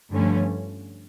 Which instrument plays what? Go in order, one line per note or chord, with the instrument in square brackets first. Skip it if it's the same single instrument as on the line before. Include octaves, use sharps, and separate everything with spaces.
[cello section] G2 D3 F3 A3 C#4